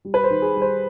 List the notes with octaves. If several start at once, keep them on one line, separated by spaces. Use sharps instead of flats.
G3
B4
C5
D#3
G#4
G3
C5